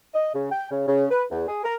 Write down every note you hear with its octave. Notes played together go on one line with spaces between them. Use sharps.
D#5
C#3
G5
C#3
C#3
B4
E2
G#4
A#4